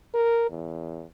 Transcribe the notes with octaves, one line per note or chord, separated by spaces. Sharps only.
A#4
E2